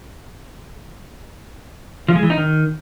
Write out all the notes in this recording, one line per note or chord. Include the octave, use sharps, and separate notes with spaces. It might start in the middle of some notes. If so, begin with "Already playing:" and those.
F3
G#3
E3
D#4
D#3